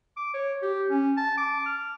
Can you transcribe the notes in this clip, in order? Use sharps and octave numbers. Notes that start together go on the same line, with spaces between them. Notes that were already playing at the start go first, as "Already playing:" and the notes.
D6
C#5
G4
C#4
A5
D6
F6